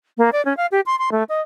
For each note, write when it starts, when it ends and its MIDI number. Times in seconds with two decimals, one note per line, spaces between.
0.18 0.30 58
0.32 0.44 74
0.45 0.56 61
0.57 0.66 77
0.72 0.81 67
0.86 0.98 84
0.99 1.10 84
1.12 1.23 57
1.29 1.41 75